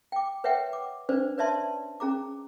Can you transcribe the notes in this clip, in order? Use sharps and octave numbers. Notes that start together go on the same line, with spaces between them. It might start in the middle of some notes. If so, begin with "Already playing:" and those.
G5 D6
B4 C#5 E5 F#5 G5
D6
C#4 D4 B4 C5 D5
B4 C#5 D5 E5 A5 C6
C#4 G#4 A#5 D6